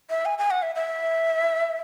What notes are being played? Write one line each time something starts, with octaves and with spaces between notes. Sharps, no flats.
E5
G#5
G#5
F#5
E5
E5